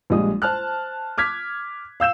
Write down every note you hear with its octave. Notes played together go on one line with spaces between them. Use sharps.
A#1 G3 G#3 D#6
C5 A5 F6 F#6
D6 F6 G#6 B6
F5 E6 G6 E7